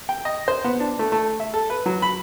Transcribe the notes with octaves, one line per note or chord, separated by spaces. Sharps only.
G5
D#5
C5
B3
D4
A3
A3
E5
A4
B4
F#3
B5